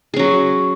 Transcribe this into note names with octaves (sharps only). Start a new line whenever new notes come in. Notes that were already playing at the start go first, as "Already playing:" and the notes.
F#3 C#4 G#4